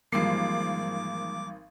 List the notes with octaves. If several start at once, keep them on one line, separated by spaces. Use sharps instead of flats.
G#1 E3 F3 G3 G#3 A#3 D6 C7